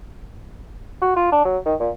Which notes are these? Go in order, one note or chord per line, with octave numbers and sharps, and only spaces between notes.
F#4
F4
D4
F#3
D#3
A#2